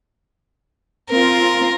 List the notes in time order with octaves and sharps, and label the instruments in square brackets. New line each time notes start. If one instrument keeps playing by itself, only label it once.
[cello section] C4 F4 [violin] A#4